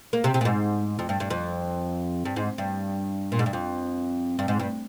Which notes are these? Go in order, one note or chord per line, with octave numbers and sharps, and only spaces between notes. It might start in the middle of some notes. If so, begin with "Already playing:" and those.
A#3
C3
C3
A#2
G#2
F2
G2
G2
F2
G2
G#2
G2
A#2
G#2
G2
F2
G2
G#2
G2